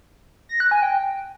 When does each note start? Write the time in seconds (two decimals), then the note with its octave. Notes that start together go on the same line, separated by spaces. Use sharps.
0.49 A#6
0.60 F#6
0.71 G#5
0.82 G5